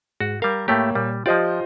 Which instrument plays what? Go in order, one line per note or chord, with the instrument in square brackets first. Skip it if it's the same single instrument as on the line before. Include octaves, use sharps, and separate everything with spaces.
[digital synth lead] G#2 [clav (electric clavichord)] F#4
[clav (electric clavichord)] G3 F5 [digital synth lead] A#4
[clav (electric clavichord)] A2 A3 G4 [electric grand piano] A#3 C#5 G5
[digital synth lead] A#2 [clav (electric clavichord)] G3
[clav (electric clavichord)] F3 D5 [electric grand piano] F4 C5 D#5 [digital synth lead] G4